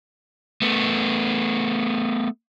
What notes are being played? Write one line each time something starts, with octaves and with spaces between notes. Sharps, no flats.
A3 B3